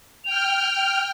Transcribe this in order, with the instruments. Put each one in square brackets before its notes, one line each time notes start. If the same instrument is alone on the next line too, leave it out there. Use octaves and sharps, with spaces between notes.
[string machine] G5 F6 [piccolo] F7